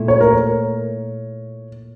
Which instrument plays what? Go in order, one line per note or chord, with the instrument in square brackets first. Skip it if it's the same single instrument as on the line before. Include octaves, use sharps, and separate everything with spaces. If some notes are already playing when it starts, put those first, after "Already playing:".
Already playing: [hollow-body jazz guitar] A#2 A3 E4
[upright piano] C#5
A#4
C#5